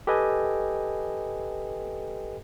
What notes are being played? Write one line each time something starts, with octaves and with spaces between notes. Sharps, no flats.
G4 A4 B4 D#5 G5 G#5